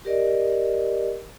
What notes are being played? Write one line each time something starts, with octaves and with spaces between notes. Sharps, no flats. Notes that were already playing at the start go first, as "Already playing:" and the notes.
G4 A#4 D5 D#5